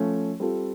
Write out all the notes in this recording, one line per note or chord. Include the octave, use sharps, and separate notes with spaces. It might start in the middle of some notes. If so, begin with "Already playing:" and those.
Already playing: F3 A3 C#4
G3 C4 F4 A4